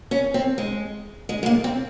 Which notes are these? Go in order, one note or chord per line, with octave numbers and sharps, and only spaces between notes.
C#4
C4
G#3
G#3
G#3
A#3
C4